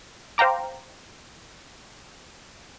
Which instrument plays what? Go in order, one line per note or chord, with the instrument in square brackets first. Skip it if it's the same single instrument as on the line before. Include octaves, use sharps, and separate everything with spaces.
[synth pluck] C5 F5 G5 A#5 D6